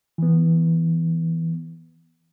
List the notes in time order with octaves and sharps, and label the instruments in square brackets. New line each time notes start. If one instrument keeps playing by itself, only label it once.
[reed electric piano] E3 B3